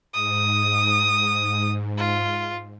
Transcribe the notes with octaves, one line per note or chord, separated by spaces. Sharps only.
G#2 D#6
F4